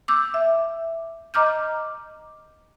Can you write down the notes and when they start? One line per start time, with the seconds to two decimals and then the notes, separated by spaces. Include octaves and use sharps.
0.08 D6 E6 G6
0.34 E5
1.34 D#5 A#5 D6 F6 G6